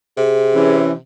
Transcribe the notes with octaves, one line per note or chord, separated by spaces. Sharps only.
C3 G#4
E3 C#4